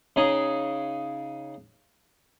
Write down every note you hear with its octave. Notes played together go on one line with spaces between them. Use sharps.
C#3 D#4 G#4